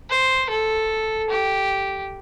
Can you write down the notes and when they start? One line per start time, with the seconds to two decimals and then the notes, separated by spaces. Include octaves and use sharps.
0.10 C5
0.50 A4
1.30 G4